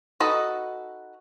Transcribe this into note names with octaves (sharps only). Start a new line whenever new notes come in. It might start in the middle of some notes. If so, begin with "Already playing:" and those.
D#4 F#4 A4 B4 D#5